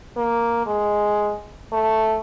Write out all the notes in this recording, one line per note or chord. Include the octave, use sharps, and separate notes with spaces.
A#3
G#3
A3